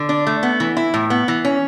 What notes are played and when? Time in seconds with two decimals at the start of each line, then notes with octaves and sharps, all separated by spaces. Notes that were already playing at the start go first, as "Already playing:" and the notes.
Already playing: D3
0.09 D4
0.27 A3
0.43 B3
0.60 E3
0.77 E4
0.94 A2
1.10 B3
1.28 E3
1.45 C#4